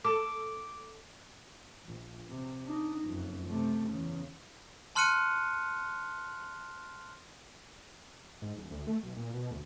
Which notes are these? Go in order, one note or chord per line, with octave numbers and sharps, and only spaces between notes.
A4 D6
A#1
C3
D4 D#4
F#1 F2
C3 A3
E2 C#3
A5 C6 F6 F#6 C#7 D#7
G#2
D#1
D2
A3
B1
A#2
B2
D2